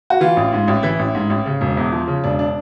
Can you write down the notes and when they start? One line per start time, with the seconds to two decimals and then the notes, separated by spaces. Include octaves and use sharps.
0.10 F#4
0.21 E3 F4
0.37 A1
0.52 G#2
0.68 A1
0.83 E3 E4
0.99 A1
1.15 G#2
1.30 A1
1.46 C#3
1.61 E1
1.77 E2
1.92 F3
2.08 C#3
2.24 E1 D4
2.39 D4